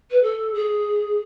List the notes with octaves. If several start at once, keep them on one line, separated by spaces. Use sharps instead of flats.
B4
A4
G#4